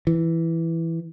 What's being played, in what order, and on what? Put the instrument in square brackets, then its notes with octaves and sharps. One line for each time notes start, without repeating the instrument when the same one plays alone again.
[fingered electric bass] E3